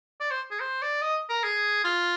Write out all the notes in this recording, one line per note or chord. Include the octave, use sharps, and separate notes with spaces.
D5
C5
G#4
C5
D5
D#5
A#4
G#4
F4